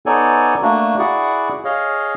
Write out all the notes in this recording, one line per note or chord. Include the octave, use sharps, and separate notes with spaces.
B3 D#4 A4 C#5 D5 G#5
A3 A#3 D4 F#4
E4 F#4 G#4 D5 F#5
G#4 C#5 D#5 F5